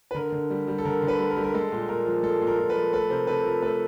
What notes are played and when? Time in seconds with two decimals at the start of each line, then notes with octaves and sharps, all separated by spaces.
0.11 B4
0.15 D3 A#4
0.32 D3
0.50 G3
0.68 G3
0.78 A4
0.85 D3 A#4
1.02 D3
1.08 A4 B4
1.19 G3
1.30 A#4
1.37 G3
1.44 A#4
1.54 G#3 A4
1.72 A#2
1.88 A#2 A#4
2.06 F3
2.23 G#3 A4
2.41 A#2
2.47 A#4
2.59 A#2
2.69 A4 B4
2.75 F3
2.92 A3 A4 B4
3.10 C3 A#4 C5
3.27 C3 A4 B4
3.45 F3 A#4
3.62 A3 A4 B4